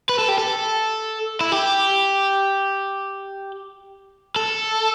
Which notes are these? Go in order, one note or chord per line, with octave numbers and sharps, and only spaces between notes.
B4
A4
G4
A4
E4
G4
A4